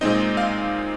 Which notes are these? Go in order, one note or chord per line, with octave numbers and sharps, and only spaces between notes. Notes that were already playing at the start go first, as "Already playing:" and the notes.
A#2 G#3 C4 D#4 D#5
F5